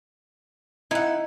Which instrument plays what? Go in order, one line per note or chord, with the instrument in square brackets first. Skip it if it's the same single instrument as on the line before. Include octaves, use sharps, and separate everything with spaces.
[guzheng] D#4 [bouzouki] E4 F#5